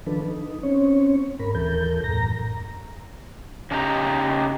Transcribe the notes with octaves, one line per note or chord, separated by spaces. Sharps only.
D#3 F3 D4 A4 B4
D#4
C4 C#4 C#5
G#2 A#4 B5
D#2 E3 A4 A#4 G6
F#2 A2 A#5 A#6
C#3 D4 D#4 G4 A#5